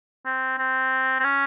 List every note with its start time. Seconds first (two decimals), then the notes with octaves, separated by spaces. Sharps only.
0.25 C4
0.58 C4
1.20 C4
1.24 C#4